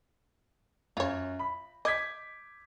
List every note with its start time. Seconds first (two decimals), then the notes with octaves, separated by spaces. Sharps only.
0.97 F#2 F4 C#5
1.39 B5
1.85 D#5 D6 G#6 B6